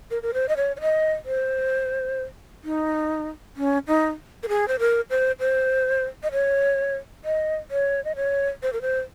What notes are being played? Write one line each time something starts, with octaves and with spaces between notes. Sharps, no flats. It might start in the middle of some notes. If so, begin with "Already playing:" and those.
A#4
A#4
C5
D#5
C#5
C#5
D#5
C5
D#4
C#4
D#4
A#4
G#4
C5
A#4
C5
C5
D#5
C#5
D#5
C#5
D#5
C#5
C5
A#4
C5